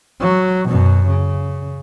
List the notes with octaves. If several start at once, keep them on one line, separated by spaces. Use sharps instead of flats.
F#3
F#2 B2
C#3